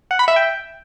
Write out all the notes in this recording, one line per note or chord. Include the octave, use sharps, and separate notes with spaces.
F#5
B5
E5
G5